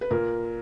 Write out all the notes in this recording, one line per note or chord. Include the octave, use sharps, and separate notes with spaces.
B4
A#2 A#4